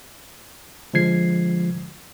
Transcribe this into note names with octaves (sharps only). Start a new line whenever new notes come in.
D3 F3 G#3 G#6 C7